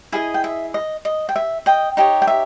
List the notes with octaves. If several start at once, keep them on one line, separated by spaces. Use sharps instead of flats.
E4 G#4 D#5 E5 G#5
G5
E5
D#5
D#5
G5
E5
D#5 G5
D#4 G4 C#5 D#5
G5
E5